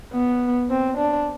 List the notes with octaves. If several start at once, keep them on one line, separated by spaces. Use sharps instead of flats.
B3
C4
D4